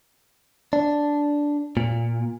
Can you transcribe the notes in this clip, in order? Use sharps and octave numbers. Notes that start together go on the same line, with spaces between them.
D4
A#2